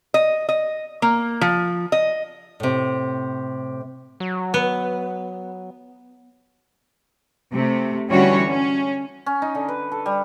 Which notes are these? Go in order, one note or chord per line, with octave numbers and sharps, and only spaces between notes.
D#5
D#5
A#3
F3
D#5
A2 C3
F#3
B3
C3 A3
D3 E3 G3 C#4 F#4 C#5
C#4
C#4
D#4
D3
B4
A4
G3